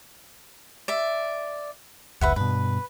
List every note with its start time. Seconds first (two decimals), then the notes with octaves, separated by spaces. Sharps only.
0.88 D5 E5
2.21 F1 C#2 B4 E5 F#5
2.36 G2 B2 B4